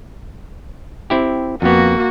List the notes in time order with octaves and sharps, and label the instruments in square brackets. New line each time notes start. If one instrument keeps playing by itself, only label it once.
[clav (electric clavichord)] C4 E4 G4
[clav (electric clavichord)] F2 B3 [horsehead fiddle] A#3 F#4